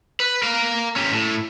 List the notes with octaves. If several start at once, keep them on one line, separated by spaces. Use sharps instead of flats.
B4
A#4 F5
C#4 G4
A2